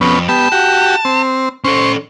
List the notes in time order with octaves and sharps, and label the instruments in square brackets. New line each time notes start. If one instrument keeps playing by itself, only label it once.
[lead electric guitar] F2 [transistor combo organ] B3 C#4
[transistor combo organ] B3 G4 [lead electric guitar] A5
[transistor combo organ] F#4 G4
C4
[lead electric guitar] C#4 A4 [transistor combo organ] C5 C#6